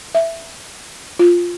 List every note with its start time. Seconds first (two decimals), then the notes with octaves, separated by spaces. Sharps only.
0.15 E5
1.19 F4